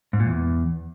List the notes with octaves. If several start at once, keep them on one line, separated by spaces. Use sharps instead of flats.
G#2
A#2
E2